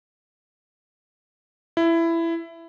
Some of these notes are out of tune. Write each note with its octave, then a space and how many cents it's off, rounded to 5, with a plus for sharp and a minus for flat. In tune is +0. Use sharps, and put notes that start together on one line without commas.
E4 +15